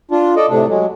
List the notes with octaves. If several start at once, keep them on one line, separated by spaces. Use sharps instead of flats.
D4 F4
A4 D5 D#5
A2 C3 D4
F#3 G#3